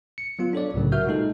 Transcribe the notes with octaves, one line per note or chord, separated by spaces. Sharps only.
C#7
F#3 B3 F4
D4 A4 C#5 D5
C2 A2 C#3 F#3
F#4 A#4 E5 F6 G6
A#2 G#3 D#4 A4